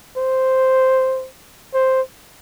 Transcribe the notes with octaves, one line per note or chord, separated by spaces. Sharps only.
C5
C5